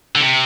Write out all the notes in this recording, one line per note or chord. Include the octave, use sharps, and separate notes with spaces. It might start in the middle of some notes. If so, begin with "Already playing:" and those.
D3
C3